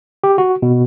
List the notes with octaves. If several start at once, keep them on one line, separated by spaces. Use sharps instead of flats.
G4
F#4
B2